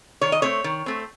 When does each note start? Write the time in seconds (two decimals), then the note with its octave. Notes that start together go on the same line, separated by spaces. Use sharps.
0.21 D#3 C#5
0.32 D#5
0.42 A3 C4 C#5
0.64 D#3
0.86 A3 C4